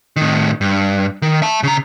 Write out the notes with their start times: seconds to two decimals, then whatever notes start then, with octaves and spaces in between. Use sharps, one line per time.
0.16 A2 D#3
0.61 G2
1.22 D#3
1.42 E5 A5
1.63 C#3 A#5